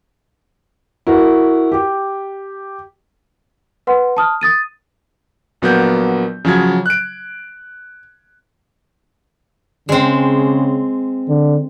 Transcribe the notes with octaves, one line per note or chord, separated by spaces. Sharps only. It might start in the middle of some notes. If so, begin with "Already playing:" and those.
E4 F#4 A#4
G4
B4 F#5 C6
A5 D#6 F6
D#6 A6 D#7
A#1 F#3 A#3 B3 G6
C#3 F3 F#3 G#6
F#6 D7
C#3 G#3 C4
D3